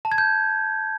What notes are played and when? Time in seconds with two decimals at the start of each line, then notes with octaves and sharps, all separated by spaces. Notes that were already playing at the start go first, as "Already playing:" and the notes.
0.05 A5
0.12 G#6
0.18 G6